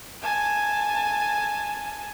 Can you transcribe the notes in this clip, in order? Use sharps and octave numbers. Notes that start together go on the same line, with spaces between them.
G#5 A5